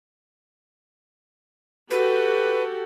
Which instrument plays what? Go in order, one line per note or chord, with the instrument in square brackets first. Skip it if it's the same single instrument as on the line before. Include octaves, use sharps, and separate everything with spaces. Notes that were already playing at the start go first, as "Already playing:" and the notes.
[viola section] F#4 G4 A4 [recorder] B4